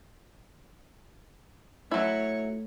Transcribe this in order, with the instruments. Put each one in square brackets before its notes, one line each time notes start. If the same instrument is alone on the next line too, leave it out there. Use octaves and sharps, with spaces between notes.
[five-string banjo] F#3 E4 [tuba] A3 [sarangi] C#5